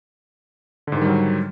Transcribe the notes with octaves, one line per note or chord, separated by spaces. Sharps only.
G#2 D3 D#3 F#3 G3